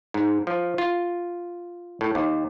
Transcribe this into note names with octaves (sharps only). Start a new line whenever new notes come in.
G#2
F3
F4
A2
D#2